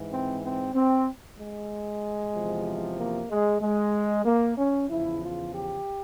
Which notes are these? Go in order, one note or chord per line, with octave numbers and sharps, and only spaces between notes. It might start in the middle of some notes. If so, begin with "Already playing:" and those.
Already playing: G#2 E3
C4
C4
C4
G#3
E2 C3 F3
A#3
G#3
G#3
A#3
C#4
E2 C#3 F3 E4
F4
G4